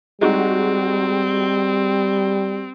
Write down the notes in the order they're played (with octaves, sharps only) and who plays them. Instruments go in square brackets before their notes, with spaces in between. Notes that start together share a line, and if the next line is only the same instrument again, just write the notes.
[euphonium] G3 [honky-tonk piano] G#3 D#4 F#4 [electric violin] C4